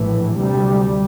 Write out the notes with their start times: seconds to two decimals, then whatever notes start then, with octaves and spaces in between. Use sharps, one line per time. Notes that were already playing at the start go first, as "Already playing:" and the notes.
Already playing: A#1 A2 E3
0.37 D2 C3 G3